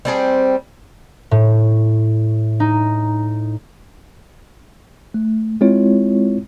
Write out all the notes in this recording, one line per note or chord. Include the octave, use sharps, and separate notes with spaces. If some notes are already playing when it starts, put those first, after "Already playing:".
G3 C4 G#4
A2
D#4
A3
G#3 C4 E4 F4 C#5